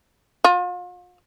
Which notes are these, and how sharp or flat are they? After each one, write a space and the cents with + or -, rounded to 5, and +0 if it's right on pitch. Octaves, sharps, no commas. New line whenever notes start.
F4 +40